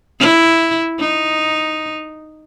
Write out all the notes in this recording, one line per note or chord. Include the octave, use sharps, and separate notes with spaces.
E4
D#4